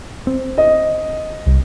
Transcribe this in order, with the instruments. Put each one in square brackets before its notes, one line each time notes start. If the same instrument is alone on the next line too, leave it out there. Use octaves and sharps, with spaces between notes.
[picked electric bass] C4
[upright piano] D#5
[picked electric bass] C2